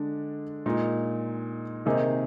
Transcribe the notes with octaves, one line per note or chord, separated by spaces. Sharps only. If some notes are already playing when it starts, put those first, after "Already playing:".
Already playing: D3 G#3 D4
A#2 G#3 D#4
C3 D#3 A#3 D#4 G#4